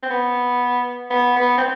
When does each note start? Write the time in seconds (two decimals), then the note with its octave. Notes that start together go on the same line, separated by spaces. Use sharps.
0.03 C4
0.10 B3
1.10 B3
1.36 B3
1.57 C4